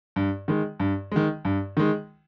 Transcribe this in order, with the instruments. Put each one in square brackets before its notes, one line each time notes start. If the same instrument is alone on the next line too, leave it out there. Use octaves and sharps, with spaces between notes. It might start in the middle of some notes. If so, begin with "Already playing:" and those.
[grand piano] G2
D#3 G#3
G2
D#3 G#3
G2
D#3 G#3